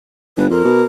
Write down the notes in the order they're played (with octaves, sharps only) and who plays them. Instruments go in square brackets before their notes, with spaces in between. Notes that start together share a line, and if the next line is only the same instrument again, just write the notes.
[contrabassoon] G1 [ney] B4
[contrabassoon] F2 [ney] A#4
[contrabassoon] B2